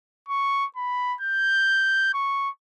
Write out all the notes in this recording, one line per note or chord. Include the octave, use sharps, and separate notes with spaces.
C#6
B5
G6
C#6